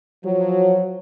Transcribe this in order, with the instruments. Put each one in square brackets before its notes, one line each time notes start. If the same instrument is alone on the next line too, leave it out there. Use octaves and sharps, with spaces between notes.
[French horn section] F3 F#3